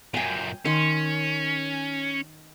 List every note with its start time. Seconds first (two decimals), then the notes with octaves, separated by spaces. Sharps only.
0.14 F#2 A#2 G5 G#5
0.65 D#3 C#4 C6